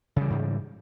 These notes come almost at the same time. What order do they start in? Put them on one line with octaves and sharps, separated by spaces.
C#3 G3 E3 G#2